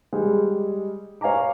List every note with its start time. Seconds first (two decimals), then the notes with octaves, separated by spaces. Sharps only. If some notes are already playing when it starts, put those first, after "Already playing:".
0.13 G3 G#3
1.21 C#5 F5 G#5 A#5 D6